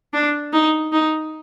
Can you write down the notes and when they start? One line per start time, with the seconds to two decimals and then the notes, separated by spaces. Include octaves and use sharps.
0.13 D4
0.53 D#4
0.92 D#4